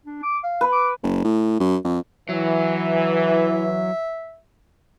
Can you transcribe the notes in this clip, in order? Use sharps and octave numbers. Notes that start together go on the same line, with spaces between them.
D4
D6
F5
B4
D6
F#1
A2
F#2
F2
E3 F#3 E5